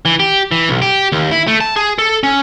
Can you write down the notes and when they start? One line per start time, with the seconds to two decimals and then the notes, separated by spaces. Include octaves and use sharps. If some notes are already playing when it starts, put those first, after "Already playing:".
0.05 E3
0.20 G4
0.52 E3
0.69 B1
0.82 G4
1.12 D#2
1.31 E4
1.47 A3
1.61 A5
1.76 G#4
1.99 A4
2.23 C#4